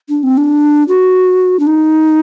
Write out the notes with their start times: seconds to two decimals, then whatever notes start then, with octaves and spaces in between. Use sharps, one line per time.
0.09 D4
0.23 C4
0.37 D4
0.88 F#4
1.60 D4
1.67 D#4